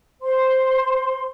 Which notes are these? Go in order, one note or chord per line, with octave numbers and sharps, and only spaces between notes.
C5 C6